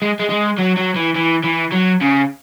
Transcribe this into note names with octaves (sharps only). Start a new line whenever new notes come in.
G#3
G#3
G#3
F#3
F#3
E3
E3
E3
F#3
C#3